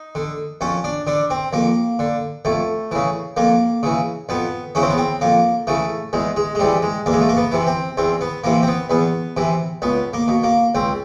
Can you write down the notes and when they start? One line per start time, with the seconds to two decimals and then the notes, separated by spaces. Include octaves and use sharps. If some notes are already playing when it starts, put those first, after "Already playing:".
Already playing: D#4
0.15 D3
0.61 F2 C#4
0.84 D4
1.07 D3 D4
1.30 C4
1.53 F2 A#3
1.99 D3
2.45 F2 A3
2.91 C#3 E3
3.37 F2 A#3
3.83 C#3 E3
4.29 F2 B3
4.75 C#3 E3 C#4
4.82 C4
4.90 B3
4.98 C4
5.21 F2 A#3
5.67 C#3 E3 A3
6.13 E2 G#3
6.36 G#3
6.55 G#3
6.59 C3 E3 G3
6.83 G#3
7.06 E2 A#3
7.13 G#3
7.21 A3
7.29 A#3
7.37 B3
7.52 C3 E3
7.67 C4
7.97 E2 C4
8.21 B3
8.44 C3 E3 A#3
8.62 C4
8.68 B3
8.90 E2 B3
9.37 C3 E3
9.82 C#2 B3
10.14 A#3
10.28 B2
10.44 A#3
10.75 C#2 C4